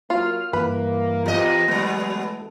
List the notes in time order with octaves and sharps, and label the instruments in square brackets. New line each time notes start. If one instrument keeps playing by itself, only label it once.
[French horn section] F#3 A#3 [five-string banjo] F4 [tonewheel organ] F5
[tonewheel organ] G2 E3 [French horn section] A#3 [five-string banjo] B4
[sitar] E2 D#5 [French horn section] B3 F4 G4
[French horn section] E3 G#3 [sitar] F#3 B3 [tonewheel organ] A3